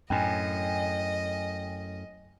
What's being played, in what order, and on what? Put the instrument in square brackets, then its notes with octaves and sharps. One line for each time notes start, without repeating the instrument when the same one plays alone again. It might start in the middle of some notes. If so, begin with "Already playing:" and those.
[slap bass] F#2 A2 [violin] D#5 [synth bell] G5 G#5